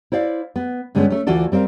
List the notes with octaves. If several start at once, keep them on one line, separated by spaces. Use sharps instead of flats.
E4 C5 D5 F5
B3
G2 D3 G#3 B3 C#4
A3 C#4
D2 E3 F4 F#4 A4 D5
G3 C4 A#4 F5